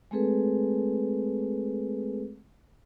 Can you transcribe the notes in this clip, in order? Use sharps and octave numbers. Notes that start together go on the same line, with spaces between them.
G#3 A3 C4 G#4 A4 B4